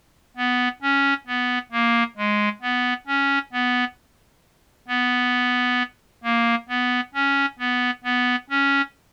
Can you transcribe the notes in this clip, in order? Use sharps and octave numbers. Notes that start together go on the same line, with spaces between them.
B3
C#4
B3
A#3
G#3
B3
C#4
B3
B3
A#3
B3
C#4
B3
B3
C#4